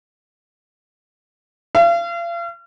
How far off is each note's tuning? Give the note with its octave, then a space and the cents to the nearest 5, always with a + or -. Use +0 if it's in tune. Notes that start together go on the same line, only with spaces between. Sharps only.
F5 -40